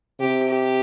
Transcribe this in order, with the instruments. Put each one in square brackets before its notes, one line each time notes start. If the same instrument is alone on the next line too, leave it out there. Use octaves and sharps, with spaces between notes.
[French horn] C3 [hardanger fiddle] G4
[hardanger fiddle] G4